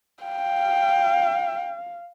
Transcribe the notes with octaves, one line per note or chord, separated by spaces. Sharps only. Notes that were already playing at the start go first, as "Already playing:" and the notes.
F5 G5